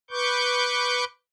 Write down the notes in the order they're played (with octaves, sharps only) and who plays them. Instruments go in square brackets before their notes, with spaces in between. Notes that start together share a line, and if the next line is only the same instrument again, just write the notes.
[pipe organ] B4 C#6 D6 G6